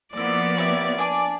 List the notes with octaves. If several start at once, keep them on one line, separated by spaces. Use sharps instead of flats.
F3 A#3 B3 E4 D5 D6
E4 G4 C#5
D4 G#5 D6